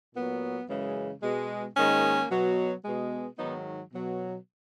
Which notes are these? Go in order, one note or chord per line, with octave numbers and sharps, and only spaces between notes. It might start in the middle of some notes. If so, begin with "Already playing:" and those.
A#2 F#3 B3
F#2 C#3 E3 G#3
B2 G#3
G#2 D#3 G#3 A#3 C#4
B2 F#3
B2 G#3
G#2 D#3 F#3 B3 D#4
B2 F#3